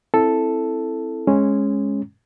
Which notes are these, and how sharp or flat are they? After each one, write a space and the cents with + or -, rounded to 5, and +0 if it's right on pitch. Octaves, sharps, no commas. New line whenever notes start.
C4 +15 E4 +0 A4 +0
G#3 +0 C#4 -15